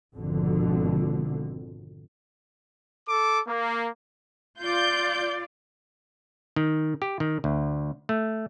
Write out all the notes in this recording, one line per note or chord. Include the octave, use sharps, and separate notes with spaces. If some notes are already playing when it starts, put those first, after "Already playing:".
G#1 F2 B2 D3
A4 D6
A#3
F4 D5 G6
D#3
G4
D#3
D2
A3